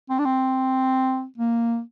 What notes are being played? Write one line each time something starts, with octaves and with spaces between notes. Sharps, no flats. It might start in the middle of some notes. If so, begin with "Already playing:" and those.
C4
D4
C4
A#3